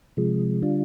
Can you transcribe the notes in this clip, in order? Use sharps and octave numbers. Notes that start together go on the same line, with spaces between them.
C3 F3 G#3
D3 G3 D4 F4